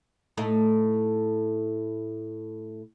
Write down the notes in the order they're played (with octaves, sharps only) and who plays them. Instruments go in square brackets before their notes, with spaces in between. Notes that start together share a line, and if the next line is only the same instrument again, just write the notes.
[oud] A2 A3 D#4